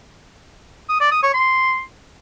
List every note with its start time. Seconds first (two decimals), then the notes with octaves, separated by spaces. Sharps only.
0.89 D#6
1.00 D5
1.12 D#6
1.23 C#5
1.34 C6